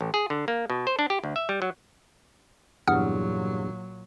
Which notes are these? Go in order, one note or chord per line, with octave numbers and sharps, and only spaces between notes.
A1
G#4
D3
A#3
B2
C5
D4
G4
D2
E5
G3
F#3
E2 G2 A#2 F#3 F#5 D#6 F6